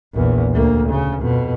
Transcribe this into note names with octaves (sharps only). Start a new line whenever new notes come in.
A#1 E2
D2 A#3
C#3
F2 B2